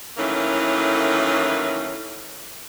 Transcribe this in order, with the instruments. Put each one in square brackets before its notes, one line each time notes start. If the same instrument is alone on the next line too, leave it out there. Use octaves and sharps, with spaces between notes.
[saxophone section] D#3 E3 F#3 A3 A#3 C#4